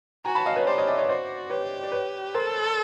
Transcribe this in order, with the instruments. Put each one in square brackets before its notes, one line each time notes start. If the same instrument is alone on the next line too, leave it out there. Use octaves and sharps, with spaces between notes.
[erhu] F#4 [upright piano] G#5 A#5
[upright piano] A5 B5
D#5 F5
B4 C#5
[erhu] G4 [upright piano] C5 D5
[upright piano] C#5 D#5
D5 E5
C#5 D#5
[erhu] F#4 [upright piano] C5 D5
[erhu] G4 [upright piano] B4 C#5
[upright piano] D5
B4 C#5
[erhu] A4 [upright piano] A#4 C5